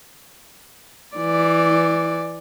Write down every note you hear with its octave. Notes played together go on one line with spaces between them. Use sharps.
E3 D5